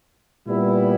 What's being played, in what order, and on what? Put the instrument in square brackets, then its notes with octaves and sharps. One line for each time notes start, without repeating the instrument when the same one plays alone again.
[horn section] A#2 G3 B3 E4